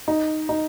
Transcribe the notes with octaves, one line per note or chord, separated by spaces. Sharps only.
D#4
D#4